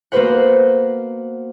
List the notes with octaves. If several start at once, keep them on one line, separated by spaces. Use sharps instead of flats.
A#3 B3 F#4 B4 C5 F#5